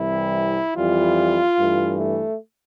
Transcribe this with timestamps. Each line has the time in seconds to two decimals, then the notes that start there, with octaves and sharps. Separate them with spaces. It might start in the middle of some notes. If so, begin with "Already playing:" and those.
Already playing: C2 C3 E3 G3 E4
0.75 F2 E3 G3 F4
1.57 G2 E3 A3
1.99 A3